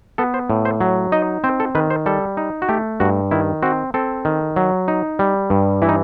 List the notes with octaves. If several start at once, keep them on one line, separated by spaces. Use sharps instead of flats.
B3 A4
C5
A2
C5
F#3
D#4 D#5
C4 C5
A4
D#3 B4
C5
G3 A4
D#4
F#4
A3 G4
G2 F#4
D#3 E4
C4 F#4
C4 A4
D#3
F#3
D#4
G3
G2
E3 E4
D#4